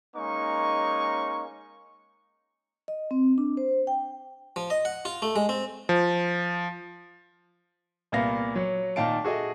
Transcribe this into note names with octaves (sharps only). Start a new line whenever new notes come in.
G#3 A#3 C#4 D#4 C#6
D#5
C4
D4
C5
G5
F3
D#5
F#5
F4
A3
G#3
C4
F3
C2 A#2 A#3 B3 F5 A#6
F#3 C#5
A#2 D#3 D#4 F5 A5 D7
F#4 G#4 A4 D#5 E5